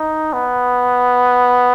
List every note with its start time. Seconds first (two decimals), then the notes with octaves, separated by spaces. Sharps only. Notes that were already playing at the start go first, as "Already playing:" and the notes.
Already playing: D#4
0.33 B3